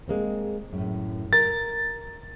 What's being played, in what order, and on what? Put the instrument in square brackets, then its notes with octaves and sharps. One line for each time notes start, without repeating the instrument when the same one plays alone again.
[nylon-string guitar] G#3 A#3 C4
F#2 A2
[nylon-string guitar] A#4 [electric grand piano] A6